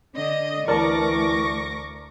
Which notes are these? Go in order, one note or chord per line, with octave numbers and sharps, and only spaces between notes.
D3 D4 D#5
D2 E3 A#4 D5 A5 C#6 D6 A#6